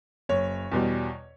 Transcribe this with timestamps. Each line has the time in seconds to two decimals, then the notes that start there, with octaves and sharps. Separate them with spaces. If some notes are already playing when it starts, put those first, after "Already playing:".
0.29 F#1 C#5
0.72 E2 B2 G3